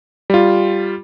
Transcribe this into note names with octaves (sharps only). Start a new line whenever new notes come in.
G3 F4